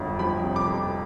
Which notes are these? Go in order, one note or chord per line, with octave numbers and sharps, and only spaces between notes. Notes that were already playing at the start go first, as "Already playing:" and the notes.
Already playing: G1 F2
F3 B5
C3
D6
F2